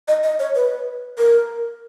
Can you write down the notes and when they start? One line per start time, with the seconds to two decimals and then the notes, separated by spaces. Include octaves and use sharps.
0.08 D#5
0.23 D#5
0.39 C#5
0.55 B4
1.18 A#4